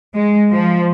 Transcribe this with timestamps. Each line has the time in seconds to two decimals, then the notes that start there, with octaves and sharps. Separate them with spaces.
0.15 G#3
0.51 F3